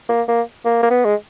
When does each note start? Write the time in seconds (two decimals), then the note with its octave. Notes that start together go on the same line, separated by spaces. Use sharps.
0.09 A#3
0.28 A#3
0.65 A#3
0.83 A#3
0.90 B3
1.05 G#3